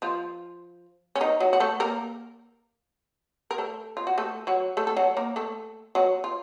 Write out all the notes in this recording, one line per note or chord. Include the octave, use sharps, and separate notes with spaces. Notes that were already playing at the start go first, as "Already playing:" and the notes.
F3 F4
C#4
D#3 D#4
F#3 F#4
F#4
A3 A4
A#3 A#4
A#4
A3 A4
F4
F#4
A3 A4
F#3 F#4
A3 A4
A4
F#3 F#4
A#3 A#4
A3 A4
F#3 F#4
F4